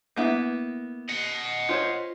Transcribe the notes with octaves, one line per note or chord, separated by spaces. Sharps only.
A#3 B3 E4
D#5 F#5
F4 C5 C#5